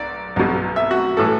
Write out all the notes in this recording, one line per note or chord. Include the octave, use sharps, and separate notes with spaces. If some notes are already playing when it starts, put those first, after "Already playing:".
Already playing: B1 D5
B1 B2
E5
F#4
A2 E3 A4